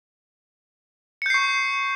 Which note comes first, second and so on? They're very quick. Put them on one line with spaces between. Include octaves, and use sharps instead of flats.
C#7 G6 C7 C#6